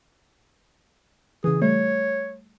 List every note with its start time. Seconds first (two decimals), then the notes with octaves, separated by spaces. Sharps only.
1.44 C#3 E3 G#4
1.62 G3 A3 C#5